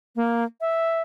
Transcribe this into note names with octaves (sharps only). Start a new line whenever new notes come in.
A#3
E5